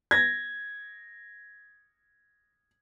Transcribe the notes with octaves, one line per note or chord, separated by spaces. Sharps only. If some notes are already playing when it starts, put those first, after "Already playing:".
G#6 A#6